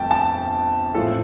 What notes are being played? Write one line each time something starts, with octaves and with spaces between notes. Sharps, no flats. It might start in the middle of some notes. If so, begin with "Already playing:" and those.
Already playing: G1 F2 F3 A3 F4 G5 A5
A5
A1 A2 F3 C4 F4 A4